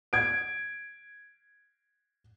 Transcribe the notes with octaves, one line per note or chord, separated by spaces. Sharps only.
G#6 D7